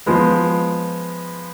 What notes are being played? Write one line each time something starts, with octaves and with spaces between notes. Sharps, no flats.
F3 G#3 B3